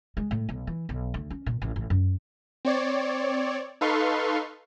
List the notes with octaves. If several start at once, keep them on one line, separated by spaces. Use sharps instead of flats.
G#3
A2
B1
E3
B1
D2
C#4
A#2
A1
A1
F#2
C4 C#5 D5
D#4 A4 B4 F5 C6 C#6